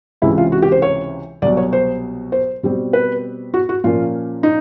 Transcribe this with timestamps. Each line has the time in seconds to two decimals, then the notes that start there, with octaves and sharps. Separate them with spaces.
0.22 C#2 C3 E3 G#3 C#4 E4
0.38 F4
0.52 F#4
0.62 G4
0.72 C5
0.82 C#5
1.42 C2 D5
1.45 B2 F#3
1.57 C#5
1.73 C5
2.32 C5
2.63 B2 G3 C4
2.93 B4
3.54 F#4
3.69 F#4
3.84 A#2 F3 A#3 C#4 F4
4.43 D#4